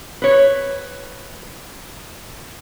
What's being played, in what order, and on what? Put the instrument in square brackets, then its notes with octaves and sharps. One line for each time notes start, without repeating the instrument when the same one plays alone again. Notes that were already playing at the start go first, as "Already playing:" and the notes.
[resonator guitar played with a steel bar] B4 C#5